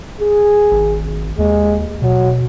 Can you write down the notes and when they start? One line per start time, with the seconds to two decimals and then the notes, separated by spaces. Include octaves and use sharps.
0.21 G#4
0.71 G#1
1.38 D#2 G#3
2.02 B2 F#3